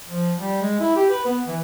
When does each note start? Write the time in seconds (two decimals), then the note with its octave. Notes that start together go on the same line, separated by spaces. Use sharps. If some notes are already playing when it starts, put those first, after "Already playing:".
0.07 F3
0.37 G3
0.62 G#3
0.80 E4
0.96 G4
1.09 B4
1.25 B3
1.47 E3